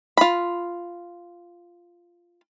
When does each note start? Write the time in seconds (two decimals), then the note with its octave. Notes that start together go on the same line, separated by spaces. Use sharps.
0.17 F4 B5